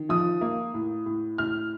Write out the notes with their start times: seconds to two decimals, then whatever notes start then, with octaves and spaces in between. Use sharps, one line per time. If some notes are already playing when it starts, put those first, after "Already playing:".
Already playing: D#3
0.09 F3 D#6
0.41 A#3
0.74 A2
1.06 A2
1.38 A2 F6